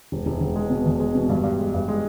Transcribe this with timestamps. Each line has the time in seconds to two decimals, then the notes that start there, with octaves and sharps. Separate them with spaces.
0.12 E1
0.26 E1
0.41 E1
0.56 G#3
0.70 B2
0.86 E2
1.00 G#3
1.15 B2
1.29 G2
1.43 G2
1.59 G#3
1.74 G2
1.88 G#3